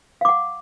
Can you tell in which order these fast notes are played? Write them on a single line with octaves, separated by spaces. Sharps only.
F5 D6 F#5